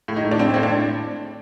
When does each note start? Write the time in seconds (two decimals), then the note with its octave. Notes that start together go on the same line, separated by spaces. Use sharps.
0.08 A2
0.16 D#4
0.24 A2
0.31 D4
0.39 A2 C4
0.54 A2 C4
0.63 D4